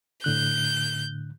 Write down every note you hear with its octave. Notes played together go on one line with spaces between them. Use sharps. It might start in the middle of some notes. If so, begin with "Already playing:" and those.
A2 D3 F#6 G6